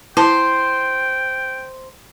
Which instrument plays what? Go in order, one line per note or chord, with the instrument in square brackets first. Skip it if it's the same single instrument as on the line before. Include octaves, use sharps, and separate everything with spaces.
[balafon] E4 A5 [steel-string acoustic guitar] C5 [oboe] G5